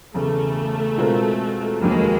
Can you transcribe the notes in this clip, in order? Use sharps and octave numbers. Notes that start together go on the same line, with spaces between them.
E1 E2 C#3 A3
B2 G#3 C4 F4 A#4
F1 D#2 D#3 F#3 G#3 A#3